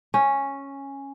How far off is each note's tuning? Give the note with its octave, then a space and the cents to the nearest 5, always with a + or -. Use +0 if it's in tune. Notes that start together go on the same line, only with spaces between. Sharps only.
C#4 -5